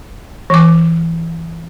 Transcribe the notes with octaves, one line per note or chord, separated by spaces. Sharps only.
E3 D6